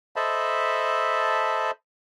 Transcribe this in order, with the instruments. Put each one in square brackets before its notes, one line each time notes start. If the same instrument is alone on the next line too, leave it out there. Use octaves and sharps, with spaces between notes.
[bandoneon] A4 C5 D#5 E5 A5 B5